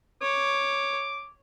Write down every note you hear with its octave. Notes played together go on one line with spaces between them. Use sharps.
C#5 D6